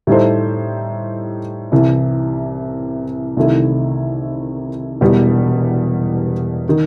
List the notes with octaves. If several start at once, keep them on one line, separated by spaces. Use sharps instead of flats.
A2 G3 D#4 A4 C5
C2 C3 E3
C2 C3 D#3 A3 E4
E1 E2 B2 G3 B3
D#3